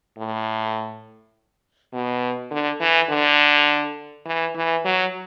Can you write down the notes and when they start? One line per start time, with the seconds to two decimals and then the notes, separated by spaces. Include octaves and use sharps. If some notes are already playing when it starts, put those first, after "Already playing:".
0.18 A2
1.93 B2
2.51 D3
2.80 E3
3.10 D3
4.25 E3
4.55 E3
4.85 F#3